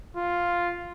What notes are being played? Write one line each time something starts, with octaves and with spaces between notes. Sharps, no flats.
F4